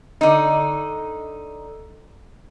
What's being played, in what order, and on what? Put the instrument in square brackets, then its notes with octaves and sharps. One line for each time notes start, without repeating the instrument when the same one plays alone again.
[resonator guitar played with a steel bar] D3 D#4